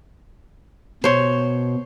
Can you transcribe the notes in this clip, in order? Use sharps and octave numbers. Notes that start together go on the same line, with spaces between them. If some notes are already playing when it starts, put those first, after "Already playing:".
B2 C5 C#5